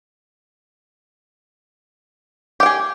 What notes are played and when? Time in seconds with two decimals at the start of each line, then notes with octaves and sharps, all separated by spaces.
2.60 G4
2.63 G5
2.66 G#4